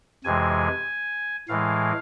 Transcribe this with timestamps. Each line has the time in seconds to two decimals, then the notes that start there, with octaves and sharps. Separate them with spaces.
0.24 F2 C3 E3 G#3 G#5
1.49 A2 E3 G#3 F5